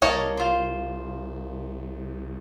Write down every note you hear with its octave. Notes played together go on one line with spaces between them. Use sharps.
C2 A#3 A#4 C#5 D#5 A5
F4 C5